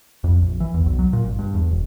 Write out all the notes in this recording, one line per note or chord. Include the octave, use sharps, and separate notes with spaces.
F2
A#1
E3
E2
B1
F#3
A#2
G#1
G2
E2
E1